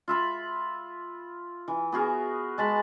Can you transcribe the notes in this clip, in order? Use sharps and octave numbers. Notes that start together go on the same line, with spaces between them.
F4 E5 B5
E3
B3 F#4 G#4 A#4
G#3 A5 B5